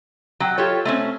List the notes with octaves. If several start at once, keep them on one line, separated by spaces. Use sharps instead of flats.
F#3 F#4 G5
F4 G4 A4 C#5
A3 C4 C#4